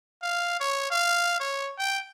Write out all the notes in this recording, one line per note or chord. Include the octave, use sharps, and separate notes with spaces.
F5
C#5
F5
C#5
G5